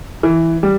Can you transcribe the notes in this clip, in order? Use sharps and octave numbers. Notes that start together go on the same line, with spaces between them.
E3
G3